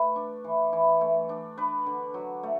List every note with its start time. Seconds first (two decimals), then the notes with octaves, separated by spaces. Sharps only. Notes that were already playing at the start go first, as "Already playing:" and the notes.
Already playing: A3 B4
0.16 D4
0.44 E3
0.73 E3
1.01 A3
1.29 D4
1.58 D4 B4
1.86 D3
2.14 F#3
2.43 A3